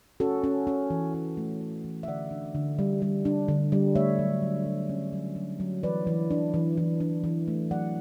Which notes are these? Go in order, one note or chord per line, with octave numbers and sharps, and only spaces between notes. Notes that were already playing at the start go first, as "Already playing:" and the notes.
C#4 F#4 A4
C#4
C#4
E3
C#4
A3
C#4
E3
E5
D3 D5 F#5
D4
D3
G3
G3
D4
D3
G3
A3 C#5 E5
F#3
F#3
F#3
C#4
F#3
F#3
F#3
E3 B4 D5
E3
D4
E3
E3
D4
E3
A3
F#3 D5 F#5